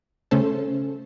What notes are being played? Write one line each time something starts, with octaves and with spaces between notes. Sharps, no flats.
C#3 A3 C#4 A4 C5